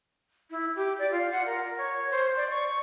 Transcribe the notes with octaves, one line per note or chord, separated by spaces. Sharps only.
E4
G4
D5
F4
F#5
A#4
C#5
C5
D5
C#6